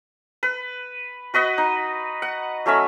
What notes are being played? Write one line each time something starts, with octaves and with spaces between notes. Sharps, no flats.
B4
F#4 B4 D#5 F#5
D#4
F#5
F#3 A3 C#4 E5